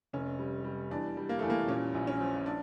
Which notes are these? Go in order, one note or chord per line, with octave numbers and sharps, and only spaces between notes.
F1 C#4
G3
G3
E2 D4
G3
A#3
E2 A3
A#3
A#2 C#4
A#1
C#4
F3
D4